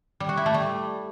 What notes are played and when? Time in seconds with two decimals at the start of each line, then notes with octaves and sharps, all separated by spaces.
0.20 G3
0.29 F#4
0.37 E4
0.46 A3
0.54 G3